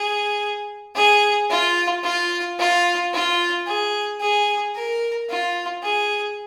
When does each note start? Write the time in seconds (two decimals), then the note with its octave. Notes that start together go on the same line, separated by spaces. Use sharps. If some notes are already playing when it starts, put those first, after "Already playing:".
Already playing: G#4
0.95 G#4
1.50 F4
2.04 F4
2.59 F4
3.13 F4
3.67 G#4
4.20 G#4
4.75 A#4
5.29 F4
5.83 G#4